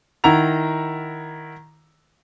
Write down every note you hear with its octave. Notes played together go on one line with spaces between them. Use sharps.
D#3 E4 F#5 A#5 F7